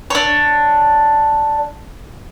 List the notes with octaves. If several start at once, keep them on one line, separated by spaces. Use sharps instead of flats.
D4 C#5